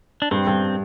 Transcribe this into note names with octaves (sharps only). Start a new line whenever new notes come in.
D4
G2 C4
G2